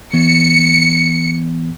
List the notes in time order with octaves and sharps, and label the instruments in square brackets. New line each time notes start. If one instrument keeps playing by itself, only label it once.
[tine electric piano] E3 B3 [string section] C#7